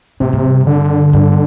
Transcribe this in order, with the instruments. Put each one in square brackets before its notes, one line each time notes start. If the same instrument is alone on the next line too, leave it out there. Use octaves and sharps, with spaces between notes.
[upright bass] A2 [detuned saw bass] C3
[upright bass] A2
G2
[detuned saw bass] D3
[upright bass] G2